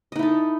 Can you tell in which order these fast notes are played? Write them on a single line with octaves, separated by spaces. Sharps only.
D#5 D#4 E4 A4